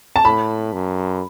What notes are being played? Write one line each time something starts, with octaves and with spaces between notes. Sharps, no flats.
A5
A2 B5
F#2